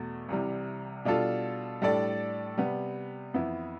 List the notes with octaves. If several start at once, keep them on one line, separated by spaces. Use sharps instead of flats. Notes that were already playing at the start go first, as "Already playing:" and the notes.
Already playing: E2 B2 A3
C2 C3 E3 G3
B2 G3 D4 F4 A4
A2 G3 D4 A4 D5
C3 G3 B3
F2 E3 B3 E4